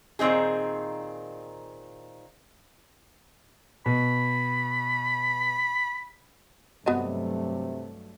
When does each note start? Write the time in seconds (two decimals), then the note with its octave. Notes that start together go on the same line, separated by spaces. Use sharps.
0.19 A#2 D#3 C4 D#4 G#4
3.86 B2 B5
6.86 G2 C3 F#3 A3 B3 F#4 D#5